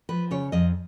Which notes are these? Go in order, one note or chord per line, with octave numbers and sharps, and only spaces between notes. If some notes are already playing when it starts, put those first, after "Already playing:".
F3 B4
C#3 C#5
F2 D#5